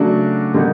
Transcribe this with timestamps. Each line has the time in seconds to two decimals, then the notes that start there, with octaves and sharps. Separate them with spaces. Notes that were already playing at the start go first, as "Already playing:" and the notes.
Already playing: C#3 F#3 A3 D4 F#4
0.54 D3 G3 A#3 D#4